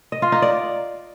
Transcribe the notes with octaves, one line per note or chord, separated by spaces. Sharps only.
D#5
F4
D#4
D5